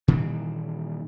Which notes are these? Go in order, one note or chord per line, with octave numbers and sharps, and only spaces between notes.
A#2 D#3 E3 G3